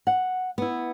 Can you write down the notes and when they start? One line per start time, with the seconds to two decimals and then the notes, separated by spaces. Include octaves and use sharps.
0.07 F#5
0.58 B3 E4